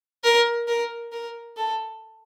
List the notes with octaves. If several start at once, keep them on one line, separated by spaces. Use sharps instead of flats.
A#4
A#4
A#4
A4